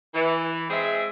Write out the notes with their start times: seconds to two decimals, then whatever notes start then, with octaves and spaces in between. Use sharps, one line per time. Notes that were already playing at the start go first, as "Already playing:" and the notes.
0.14 E3
0.69 G#3 C4 G#4 E5